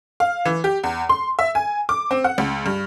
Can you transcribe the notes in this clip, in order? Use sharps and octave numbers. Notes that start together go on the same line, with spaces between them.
F5
E3
G4
E2
C6
E5
G#5
D6
C4
F#5
C#2
G2